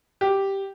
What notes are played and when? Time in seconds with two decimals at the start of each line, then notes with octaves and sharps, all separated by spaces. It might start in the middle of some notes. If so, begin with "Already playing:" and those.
0.21 G4